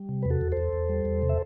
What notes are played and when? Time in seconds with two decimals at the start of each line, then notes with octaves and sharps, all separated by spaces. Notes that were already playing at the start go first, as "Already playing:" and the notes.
Already playing: G3
0.09 C3
0.22 B4
0.25 E2
0.30 F#4 A4
0.41 E2
0.52 A4 C5
0.57 E2
0.73 E2
0.89 G3
1.05 E2
1.22 C3
1.29 E5